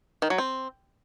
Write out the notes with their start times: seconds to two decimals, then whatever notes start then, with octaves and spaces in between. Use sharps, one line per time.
0.22 D#3
0.30 F#3
0.38 C4